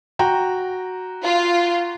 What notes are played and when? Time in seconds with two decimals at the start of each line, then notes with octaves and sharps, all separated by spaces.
0.19 F#4 G5 A#5
1.23 F4